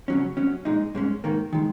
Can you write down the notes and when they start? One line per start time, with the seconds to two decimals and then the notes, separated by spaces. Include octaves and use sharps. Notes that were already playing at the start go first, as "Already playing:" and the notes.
0.08 C#3 F#3 C#4
0.37 F#2 F#3 C#4
0.65 A#2 G#3 D#4
0.95 G#2 G#3 C#4
1.24 G#2 D#3 A#3
1.53 D#3 G#3